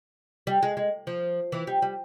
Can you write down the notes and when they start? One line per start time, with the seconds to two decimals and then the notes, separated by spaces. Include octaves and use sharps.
0.47 G3
0.63 G#3
0.77 G#3
1.07 F3
1.52 E3
1.67 G3
1.82 G3